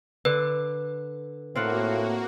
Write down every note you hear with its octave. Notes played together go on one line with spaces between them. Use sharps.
D3 B4
A2 A#3 C4 F4 F#4 F#5